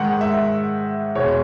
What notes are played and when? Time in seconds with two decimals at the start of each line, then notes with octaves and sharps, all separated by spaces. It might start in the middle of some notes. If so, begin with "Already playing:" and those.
Already playing: G#2 D#3 G#3 F#5
0.21 E5
1.15 E2 B2 G#3 C#5